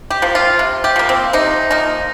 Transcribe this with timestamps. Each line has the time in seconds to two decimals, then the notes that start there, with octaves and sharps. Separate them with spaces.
0.10 G4
0.22 F3 A#3
0.35 F4
0.59 C3
0.84 G4
0.96 F3 A#3
1.09 C4
1.33 C3 D#4
1.71 F3 A#3 D#4